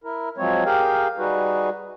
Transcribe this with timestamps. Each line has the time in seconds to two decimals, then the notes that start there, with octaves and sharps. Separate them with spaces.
0.04 E4 A#4
0.38 F3 F#3 G#3 C4 C#5
0.65 G4 G#4 A#4 F5 G5
1.18 G3 D#4 F#4 G#4 B4